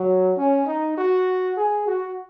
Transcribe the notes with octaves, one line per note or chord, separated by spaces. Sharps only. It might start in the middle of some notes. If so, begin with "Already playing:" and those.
Already playing: F#3
C#4
D#4
F#4
G#4
F#4